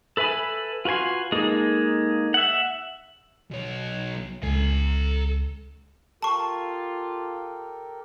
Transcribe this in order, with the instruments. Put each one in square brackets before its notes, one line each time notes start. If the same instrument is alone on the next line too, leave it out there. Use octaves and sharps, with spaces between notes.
[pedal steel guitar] A4 B4 E5 G#5 B5
F4 F#4 B4 G#5 C6
G#3 A#3 D#4 G#4 A4
E5 F#5
[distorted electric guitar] B1 C#5
[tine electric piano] C#2 [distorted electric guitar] A4 G#5
[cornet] F4 [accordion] G4 A4 A#4 [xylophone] A5 C#6